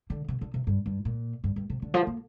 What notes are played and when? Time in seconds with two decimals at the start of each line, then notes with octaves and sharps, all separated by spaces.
0.10 D3
0.28 C3
0.41 D3
0.54 C3
0.67 G2
0.86 G2
1.05 A#2
1.44 G2
1.56 G2
1.70 C3
1.82 D3
1.94 F3
2.07 A#3